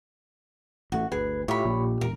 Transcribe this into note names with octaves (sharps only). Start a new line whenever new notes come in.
A1 A3 F#4
G1 D2 G#4 B4
A2 F4 G4 C#5 E5 B5
A#1 A#2 G4
E1 A#4